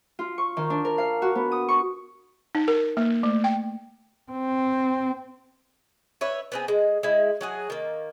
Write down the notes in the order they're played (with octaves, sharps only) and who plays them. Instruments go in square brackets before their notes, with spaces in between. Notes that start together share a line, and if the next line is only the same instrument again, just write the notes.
[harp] F4
C#6
D#3
D4
A#4
F5
F#4
B3
D#6
C#6
[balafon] D#4
A#4
A#3
A3
G5
[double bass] C4
[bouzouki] B4 C#5 E5
B3 C4 G#4
G#3
G#3 E4
F#3 F#4 G#4
D#3 A#3